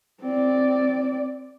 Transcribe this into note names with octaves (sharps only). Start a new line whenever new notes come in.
C4 D5